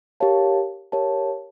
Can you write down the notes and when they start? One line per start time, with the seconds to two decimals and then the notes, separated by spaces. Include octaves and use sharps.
0.20 G4 A#4 C#5 F5 A5
0.92 G4 A#4 C#5 F5 A5